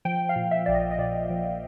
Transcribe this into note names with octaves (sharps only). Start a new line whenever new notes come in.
F3 G5
F5
A#2
E5
A#1 D5
D#5
D#5
A#2 D5
F3